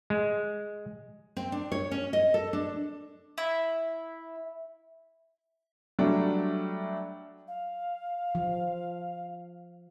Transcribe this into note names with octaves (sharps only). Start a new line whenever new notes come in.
G#3
C4
D4
C#5
C#4
D#5
A4
D4
E4
F#3 G3 A3 D4
F5
F3